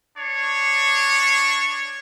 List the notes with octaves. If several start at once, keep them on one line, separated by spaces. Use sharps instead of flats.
D4 C#5